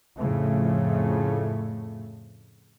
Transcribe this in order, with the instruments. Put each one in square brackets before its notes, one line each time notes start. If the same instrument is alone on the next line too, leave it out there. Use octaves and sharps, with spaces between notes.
[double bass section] F2 A2 C#3 A3